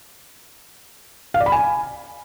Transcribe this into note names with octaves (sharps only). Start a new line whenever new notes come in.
F5
D5
B5
G#5